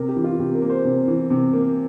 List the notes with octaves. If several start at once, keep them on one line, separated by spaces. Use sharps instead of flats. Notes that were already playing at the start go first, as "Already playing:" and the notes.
Already playing: C3 A#4
G4
E3
F4
C3 G4
A#4
A#3
C5
C3
E3
C3
A#3